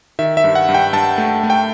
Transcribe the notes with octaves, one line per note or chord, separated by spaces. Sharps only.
D#3 E5
E5
G2
F#5
G2
G5
G2 A5
A3
A3
G5